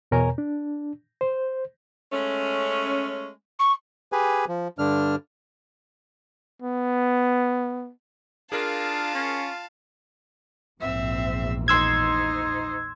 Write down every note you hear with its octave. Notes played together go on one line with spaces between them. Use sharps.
E2 B2 A#4 C#5 G#5 A#5
D4
C5
G#3 A3 C#4
C#6
G4 G#4 B4 G#5
F3
G2 D3 D4 F6
B3
D4 F4 G#4 A#4 F5 A5
C#4
A#1 E2 G#2 C4 E5
D#4 C5 C6 E6 G#6